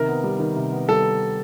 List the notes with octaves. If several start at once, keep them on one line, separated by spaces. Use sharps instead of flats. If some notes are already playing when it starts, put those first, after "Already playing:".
Already playing: C3 D#3 A#4
B3
G3
D#3
C3
B3
G3 A4